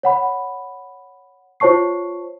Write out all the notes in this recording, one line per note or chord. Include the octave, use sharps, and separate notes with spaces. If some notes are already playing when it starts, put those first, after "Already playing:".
C#5 F#5 B5
F4 C5 C#5 A5 C#6 C7